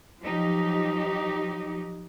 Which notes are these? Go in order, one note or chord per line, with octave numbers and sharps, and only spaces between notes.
F3 F#3 D#4 G4